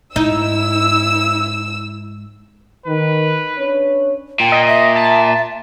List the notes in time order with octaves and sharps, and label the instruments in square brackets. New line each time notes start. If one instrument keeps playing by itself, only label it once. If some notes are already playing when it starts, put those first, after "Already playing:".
[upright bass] G#2 [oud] D#4 [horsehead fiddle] E4 [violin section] E6
[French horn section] D#3 [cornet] B4
[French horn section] C#4 D4 C#5
[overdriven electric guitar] A#2 [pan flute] G5
[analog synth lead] D#5
[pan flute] E5
[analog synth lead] A5